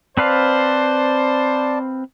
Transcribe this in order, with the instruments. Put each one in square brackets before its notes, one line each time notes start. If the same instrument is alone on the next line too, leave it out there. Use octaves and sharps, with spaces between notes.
[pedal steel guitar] C4 B4 F5 [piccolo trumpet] C5 [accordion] D5 A5